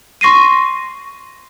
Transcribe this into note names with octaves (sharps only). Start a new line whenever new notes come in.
C6 C#6 A#6 C7 D#7